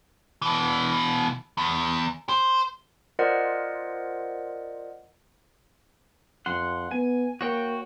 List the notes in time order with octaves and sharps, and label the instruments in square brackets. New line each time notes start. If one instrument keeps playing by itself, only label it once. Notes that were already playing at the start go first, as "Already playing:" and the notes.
[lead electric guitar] B2 E3
E2
C5
[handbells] F4 A#4 C5 D5 D#5 F#5
[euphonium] F2 [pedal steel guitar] F#5 C6
[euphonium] B3 [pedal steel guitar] G#5
[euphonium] A#3 [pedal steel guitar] F#4 C#5 G5